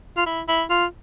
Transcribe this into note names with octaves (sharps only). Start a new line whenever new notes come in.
F4
E4
E4
F4